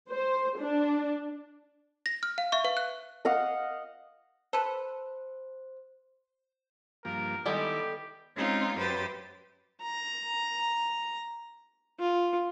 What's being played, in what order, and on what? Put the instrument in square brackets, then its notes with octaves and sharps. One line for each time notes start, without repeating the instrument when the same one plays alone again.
[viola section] C5
D4
[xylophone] A#6
F6
F5
E5 C#6
B4 F5
F#6
[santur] D#5 F5 F#5
[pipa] A4 B4 [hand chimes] C5
[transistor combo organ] G2 F3 A#3 [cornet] A#4
[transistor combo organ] D#3 E4 D5 [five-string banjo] G3 G#3 B3 [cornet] G4 [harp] A4
[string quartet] G#3 C4 C#4 D#4 F4
F#2 F#3 G4 B4 C5 A6
[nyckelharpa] A#5
F4